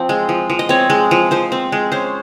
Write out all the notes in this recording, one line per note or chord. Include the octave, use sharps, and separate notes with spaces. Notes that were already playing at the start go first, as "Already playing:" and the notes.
Already playing: F3 C4
G#3
F3
F3
D#5
C4 C#5
G#3
F3
F3 C5
C4
G#3
C#4 C5